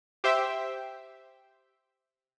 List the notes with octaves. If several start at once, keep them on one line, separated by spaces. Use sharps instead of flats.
G4 C5 E5 G5